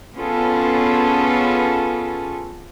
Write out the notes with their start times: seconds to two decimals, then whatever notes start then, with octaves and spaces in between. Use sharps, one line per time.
0.14 B3 C#4 F4 G#4 A4